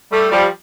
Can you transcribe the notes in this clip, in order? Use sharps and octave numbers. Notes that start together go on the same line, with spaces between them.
G3 A3
F3 G3